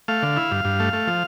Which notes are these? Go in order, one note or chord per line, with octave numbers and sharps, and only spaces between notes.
A3 F5
D3
E4
G2
G2
A3
A3
F3